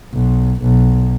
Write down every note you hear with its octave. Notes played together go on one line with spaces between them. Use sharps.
B1
B1